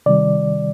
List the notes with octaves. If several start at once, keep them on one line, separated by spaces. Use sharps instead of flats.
C3 D#3 G3 D5